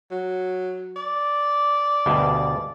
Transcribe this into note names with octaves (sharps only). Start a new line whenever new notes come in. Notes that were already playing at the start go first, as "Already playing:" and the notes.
F#3
D5
D2 G2 B2